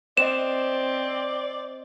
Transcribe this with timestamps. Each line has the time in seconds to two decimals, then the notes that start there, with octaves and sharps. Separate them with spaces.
0.17 C4 C5 D5 D#5 E7